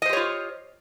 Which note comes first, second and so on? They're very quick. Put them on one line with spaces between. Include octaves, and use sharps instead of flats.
D#5 C5 G4 C#5 F4